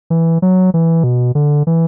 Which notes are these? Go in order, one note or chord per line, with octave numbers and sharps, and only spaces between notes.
E3
F#3
E3
B2
D3
E3